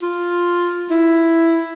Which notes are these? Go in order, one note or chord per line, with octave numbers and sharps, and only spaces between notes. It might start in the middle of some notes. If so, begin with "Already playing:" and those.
F4
E4